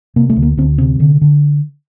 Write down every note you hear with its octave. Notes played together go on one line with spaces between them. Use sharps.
C3 A#3
A3
D2
A#3
D2 C4
C3 C4
D3
D3